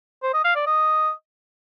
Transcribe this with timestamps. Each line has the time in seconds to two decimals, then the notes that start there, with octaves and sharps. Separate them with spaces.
0.23 C5
0.34 D#5
0.45 F5
0.56 D5
0.67 D#5